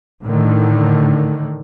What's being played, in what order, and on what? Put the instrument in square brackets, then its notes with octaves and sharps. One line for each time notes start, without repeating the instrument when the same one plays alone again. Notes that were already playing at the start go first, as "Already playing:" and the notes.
[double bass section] A2 D3 D#3